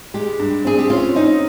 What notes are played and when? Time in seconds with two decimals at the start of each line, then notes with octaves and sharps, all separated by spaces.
0.14 G#3 G4
0.39 G2
0.65 C4 G#4
0.79 G4
0.90 C#4 F4
1.15 C#4 D#4